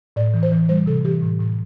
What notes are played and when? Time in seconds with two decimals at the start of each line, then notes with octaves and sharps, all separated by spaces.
0.16 A2 D5
0.34 E3
0.43 C5
0.52 E3
0.69 G3 C5
0.86 C3 A4
1.05 E3 G4
1.22 A2
1.40 A2